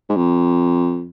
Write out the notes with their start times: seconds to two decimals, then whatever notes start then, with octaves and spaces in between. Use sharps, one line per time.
0.09 G#2
0.16 F2